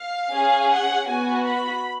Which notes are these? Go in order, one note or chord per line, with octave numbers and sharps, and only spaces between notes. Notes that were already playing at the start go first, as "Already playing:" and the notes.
Already playing: F5
C#4 G#4
F#5
B3 F#4 G#5
B5